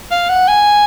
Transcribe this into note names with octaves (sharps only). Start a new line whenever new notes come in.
F5
F#5
G#5